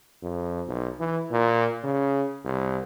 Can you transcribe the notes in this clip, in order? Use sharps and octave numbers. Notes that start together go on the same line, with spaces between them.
F2
B1
E3
A#2
C#3
C2